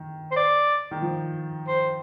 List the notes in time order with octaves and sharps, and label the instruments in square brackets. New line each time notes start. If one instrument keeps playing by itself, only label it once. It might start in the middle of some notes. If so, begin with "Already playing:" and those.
Already playing: [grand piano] D#3
[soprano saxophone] C5
D5
[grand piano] D#3
F3
[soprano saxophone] C5